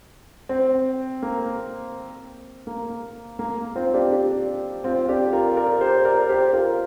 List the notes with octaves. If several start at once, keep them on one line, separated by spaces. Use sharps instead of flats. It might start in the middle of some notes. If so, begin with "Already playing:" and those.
C4
A#3
A#3
A#3
C4 F4
D4 G4
D4 G4
C4 F4
D4 G4
F4 A#4
A#4 D5
G4 C5
A#4 D5
G4 C5
F4 A#4